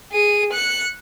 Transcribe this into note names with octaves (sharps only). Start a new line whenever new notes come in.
G#4 D#7
F#6 C#7